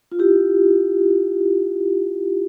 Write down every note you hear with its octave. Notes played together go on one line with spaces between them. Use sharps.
F4
E4 G4